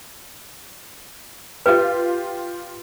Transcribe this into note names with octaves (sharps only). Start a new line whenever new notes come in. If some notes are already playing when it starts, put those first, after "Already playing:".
F4 G4 B4